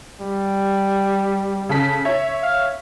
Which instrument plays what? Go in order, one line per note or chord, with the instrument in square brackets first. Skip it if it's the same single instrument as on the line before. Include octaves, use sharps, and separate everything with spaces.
[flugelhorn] G3
[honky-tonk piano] C#3 A4 B6
C#5 E5
[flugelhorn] F5